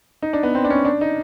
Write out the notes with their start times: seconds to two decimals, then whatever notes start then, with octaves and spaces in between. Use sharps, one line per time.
0.22 D#4
0.33 D4
0.43 B3
0.55 C4
0.65 D4
0.70 C#4
0.85 D4
1.01 D#4